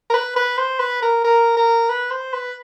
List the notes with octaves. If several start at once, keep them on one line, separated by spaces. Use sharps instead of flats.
A#4
B4
B4
C5
B4
A#4
A#4
A#4
B4
C5
B4